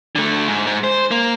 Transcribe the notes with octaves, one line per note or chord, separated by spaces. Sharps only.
D3 A3
G#2
G#2
C5
A#3